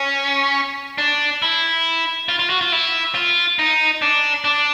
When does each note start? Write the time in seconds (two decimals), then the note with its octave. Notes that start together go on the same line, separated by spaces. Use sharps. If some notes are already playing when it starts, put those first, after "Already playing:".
Already playing: C#4
0.98 D4
1.42 E4
2.29 F4
2.39 F4
2.50 F#4
2.61 F4
2.72 E4
3.15 F4
3.59 D#4
4.02 D4
4.45 D4